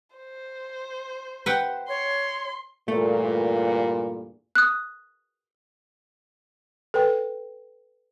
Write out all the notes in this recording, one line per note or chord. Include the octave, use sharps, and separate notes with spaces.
C5
B4 F#5 G5
C#5 C6
E2 G2 A#2 A3
D#6 F#6
A4 B4 G5